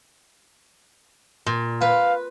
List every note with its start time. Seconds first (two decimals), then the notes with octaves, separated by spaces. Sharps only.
1.46 A#2
1.81 B4 F5